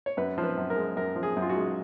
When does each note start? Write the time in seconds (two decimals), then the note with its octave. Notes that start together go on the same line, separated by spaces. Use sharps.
0.06 C#5
0.17 F#2 B4
0.38 F3
0.44 B4
0.57 F#2
0.70 A#4
0.76 G#3
0.96 F#2 A#4
1.16 F3
1.23 G#4
1.36 F#2
1.42 F4
1.49 F#4
1.56 G#3